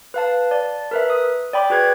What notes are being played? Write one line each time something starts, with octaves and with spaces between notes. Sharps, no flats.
B4 F5 A5
D5 A5
A#4 B4 E5
D#6
D5 G5 B5 D6
F#4 G#4 B4 G#6